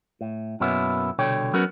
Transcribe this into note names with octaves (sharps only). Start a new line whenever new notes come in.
A2
F#2 B2 A#3 B3 C#4 E4
C2 B2 D3 C#5 G5
F#3 B3 C#4 F#4 A#4